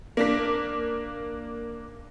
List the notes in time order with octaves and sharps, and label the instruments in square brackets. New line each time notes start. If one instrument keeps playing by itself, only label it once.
[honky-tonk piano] A#3 D4 B6